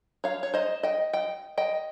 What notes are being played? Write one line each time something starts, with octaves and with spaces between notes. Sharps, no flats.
C#5 F5
C#5
C5 D#5
D#5 G5
D#5 G5
D#5 G5